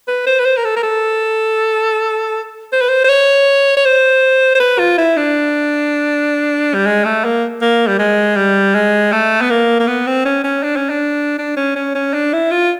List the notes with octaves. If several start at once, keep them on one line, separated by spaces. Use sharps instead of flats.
B4
C5
B4
C5
A#4
A4
A#4
A4
C5
B4
C5
C5
C#5
C#5
C5
C5
B4
F4
E4
D4
G3
G#3
A3
A#3
A#3
G3
G#3
G3
G#3
A3
B3
A#3
A#3
B3
C4
C#4
C#4
D4
C#4
D4
D4
C#4
C#4
C#4
D4
E4
F4